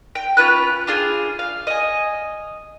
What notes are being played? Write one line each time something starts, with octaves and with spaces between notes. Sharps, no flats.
G5
C#4 F4 B4 F#6
D4 F4 G#4
F5
D#5 G#5